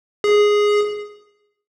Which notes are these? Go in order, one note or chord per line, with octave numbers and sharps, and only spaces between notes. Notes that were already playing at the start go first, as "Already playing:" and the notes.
G#4